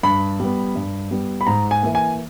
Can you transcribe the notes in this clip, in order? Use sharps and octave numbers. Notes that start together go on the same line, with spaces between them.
G2 B5
G3 B3
G2
G3 B3
B5
G#2 A#5
G#5
E3 A#3
G#5